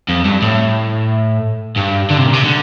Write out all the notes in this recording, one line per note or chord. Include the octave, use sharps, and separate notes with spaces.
F2
G2
A2
G2
D3
C3
A#2
C3
D3